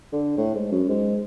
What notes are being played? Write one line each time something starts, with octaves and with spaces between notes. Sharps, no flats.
D3
A2
G#2
F#2
G#2